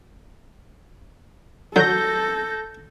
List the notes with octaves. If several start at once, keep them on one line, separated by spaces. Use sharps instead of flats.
D3 F#3 A4 G6 A#6